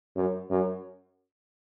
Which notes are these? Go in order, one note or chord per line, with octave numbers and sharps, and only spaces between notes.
F#2
F#2